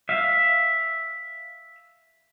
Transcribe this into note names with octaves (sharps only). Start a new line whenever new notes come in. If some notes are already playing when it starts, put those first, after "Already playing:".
E5 F5